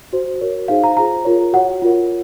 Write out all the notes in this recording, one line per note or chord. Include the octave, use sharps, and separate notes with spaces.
F#4 C5
F#4 A#4 C#5
D#4 G#4 C5 F5
A#5
F4 G#4 C5 A#5
F4 A#4 C#5
F#4 C#5 F#5
F4 A#4 C#5